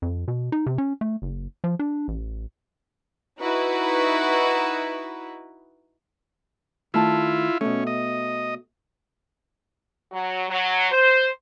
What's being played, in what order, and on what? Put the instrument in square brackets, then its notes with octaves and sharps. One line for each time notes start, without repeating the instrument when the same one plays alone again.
[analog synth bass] F2
B2
D#4
C3
C#4
A3
F#1
F3
D4
A1
[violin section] D#4 E4 F#4 B4
[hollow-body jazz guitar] D#3 A3 A5 [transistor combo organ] E4 F4
[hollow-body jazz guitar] B2 A3 [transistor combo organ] C#4
[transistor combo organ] D#5
[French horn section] F#3
F#3
C5